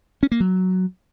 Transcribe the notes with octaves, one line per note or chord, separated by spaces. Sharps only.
C#4
A#3
F#3